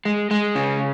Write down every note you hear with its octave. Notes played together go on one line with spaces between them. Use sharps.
G#3
G#3
C#3